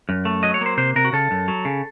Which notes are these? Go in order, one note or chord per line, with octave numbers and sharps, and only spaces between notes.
F#2
A3
F#3 D#5
C#5
A#3 C5
C3 C5
C3 A#4
F#4
C#3 A4
F#2
F#3
C#3